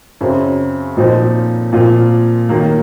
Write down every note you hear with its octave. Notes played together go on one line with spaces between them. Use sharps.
F#2 C#3 F#3 C4
A#2 F3 C4 D#4
A#2 F3 C4 F4
D#3 F#3 A#3